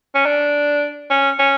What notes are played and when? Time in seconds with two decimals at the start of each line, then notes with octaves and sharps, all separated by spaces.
0.15 C#4
0.26 D4
1.10 C#4
1.39 C#4